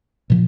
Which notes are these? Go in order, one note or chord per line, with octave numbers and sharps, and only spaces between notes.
A#2 F3